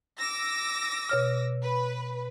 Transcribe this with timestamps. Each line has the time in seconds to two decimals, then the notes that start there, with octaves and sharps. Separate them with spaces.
0.18 D6 E6 A#6
1.09 B2 C#5 F6
1.62 B4